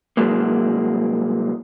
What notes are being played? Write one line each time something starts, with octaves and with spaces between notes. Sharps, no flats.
C2 F#2 F#3 G#3 A#3